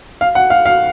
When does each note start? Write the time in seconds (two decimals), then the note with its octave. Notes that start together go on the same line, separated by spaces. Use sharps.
0.21 F5
0.35 F#5
0.50 F5
0.66 F5